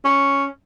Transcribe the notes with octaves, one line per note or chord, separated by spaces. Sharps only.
C#4